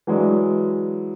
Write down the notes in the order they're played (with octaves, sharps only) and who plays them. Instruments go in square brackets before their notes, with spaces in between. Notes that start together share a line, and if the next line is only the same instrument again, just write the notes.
[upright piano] E3 F#3 G#3 D4